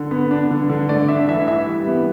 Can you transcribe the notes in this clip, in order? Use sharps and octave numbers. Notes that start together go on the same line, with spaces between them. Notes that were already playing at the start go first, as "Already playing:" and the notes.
Already playing: D3
B3
D4
D3
D3
A3 D5
D4 E5
E3 E5
E3 E5
G3
B3